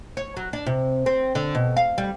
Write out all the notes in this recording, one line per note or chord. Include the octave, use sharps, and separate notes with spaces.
C#5
F#3
D4
C3
C4
D3
B2
F5
G3